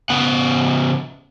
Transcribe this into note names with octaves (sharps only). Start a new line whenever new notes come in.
C#3 B3 F#5